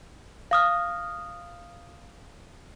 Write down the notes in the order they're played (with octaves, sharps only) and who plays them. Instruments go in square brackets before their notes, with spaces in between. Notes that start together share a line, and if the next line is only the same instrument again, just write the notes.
[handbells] F5 D#6 F6